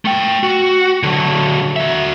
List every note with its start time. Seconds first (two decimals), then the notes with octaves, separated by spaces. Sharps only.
0.05 A3 G5
0.43 F#4
1.03 D3 F#3
1.76 F#4 E5